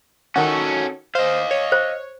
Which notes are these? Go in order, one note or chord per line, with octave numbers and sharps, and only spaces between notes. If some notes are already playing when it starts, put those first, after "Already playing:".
D#3 C#4 F#4 A4
C5 D#5 F5
C#5
C5